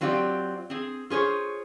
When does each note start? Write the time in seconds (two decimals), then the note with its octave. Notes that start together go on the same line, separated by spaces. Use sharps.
0.01 F#3 C4 F4 G4 D5
0.70 C4 G#4
1.10 F4 G#4 C5 C#5